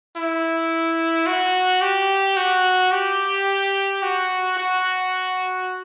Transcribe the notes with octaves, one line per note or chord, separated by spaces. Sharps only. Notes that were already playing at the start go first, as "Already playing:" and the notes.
E4
F#4
G4
F#4
G4
F#4
F#4